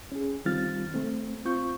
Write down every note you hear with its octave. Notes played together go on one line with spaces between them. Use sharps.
C#4 G#4
D#3 G3 C4 F4 F6 A6
A3 C4
C4 F4 C#6 G6